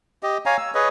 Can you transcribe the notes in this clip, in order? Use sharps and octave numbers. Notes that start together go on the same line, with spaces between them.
G4 D#5
C#5 F5 G#5 A#5
E6
G#4 B4 C#5 D#5